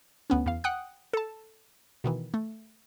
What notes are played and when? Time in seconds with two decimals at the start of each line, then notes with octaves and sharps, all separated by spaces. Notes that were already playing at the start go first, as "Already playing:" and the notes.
0.30 D2 B3 C#4
0.46 E2 F5
0.64 F#5 G5 D#6 F#6
1.13 A4 A5
2.04 B2 D#3 E3
2.34 A3